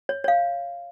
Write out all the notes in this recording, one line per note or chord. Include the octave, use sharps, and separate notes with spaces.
C#5
C#5 F5